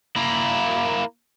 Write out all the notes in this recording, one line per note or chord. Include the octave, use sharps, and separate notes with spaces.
A#3 E4